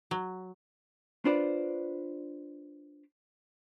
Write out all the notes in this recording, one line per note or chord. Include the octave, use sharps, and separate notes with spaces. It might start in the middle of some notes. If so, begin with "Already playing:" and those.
F#3
D4 F4 B4 C5 D5